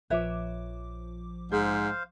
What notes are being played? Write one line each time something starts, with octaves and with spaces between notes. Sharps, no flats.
A#1 F3 B4 C#5 E5 D6
G#2 G#4 C5 F5